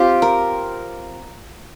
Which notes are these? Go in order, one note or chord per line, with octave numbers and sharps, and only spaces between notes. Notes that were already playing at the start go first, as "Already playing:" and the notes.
Already playing: C4 F4 G4
A#4